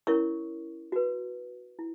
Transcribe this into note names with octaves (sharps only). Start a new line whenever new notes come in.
C#4 E4 A#4 C#5 C#6
F#4 B4
E4